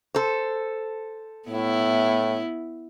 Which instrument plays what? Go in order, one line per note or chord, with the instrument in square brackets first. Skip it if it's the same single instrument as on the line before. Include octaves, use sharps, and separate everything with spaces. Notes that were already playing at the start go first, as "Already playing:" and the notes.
[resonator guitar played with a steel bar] A4 C5
[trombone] A2 [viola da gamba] B3 E4